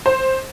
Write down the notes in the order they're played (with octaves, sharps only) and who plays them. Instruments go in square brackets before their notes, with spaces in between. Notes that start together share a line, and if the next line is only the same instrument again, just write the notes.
[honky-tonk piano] C5